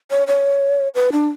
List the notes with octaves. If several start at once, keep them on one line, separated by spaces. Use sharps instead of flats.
C#5
C#5
B4
D4